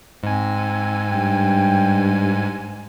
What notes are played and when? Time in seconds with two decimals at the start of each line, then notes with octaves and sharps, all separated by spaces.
0.23 G#2 C4 G#5
1.12 G2 G5